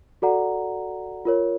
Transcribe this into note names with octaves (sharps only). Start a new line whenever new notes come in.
F#4 A4 D5 F#5 A#5
F4 A#4 C#5